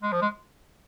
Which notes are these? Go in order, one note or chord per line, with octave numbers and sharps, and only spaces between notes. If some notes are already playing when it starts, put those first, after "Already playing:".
G#3
F3
G#3